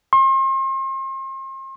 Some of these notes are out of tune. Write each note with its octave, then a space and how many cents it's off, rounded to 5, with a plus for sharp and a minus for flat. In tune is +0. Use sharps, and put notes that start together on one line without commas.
C6 +40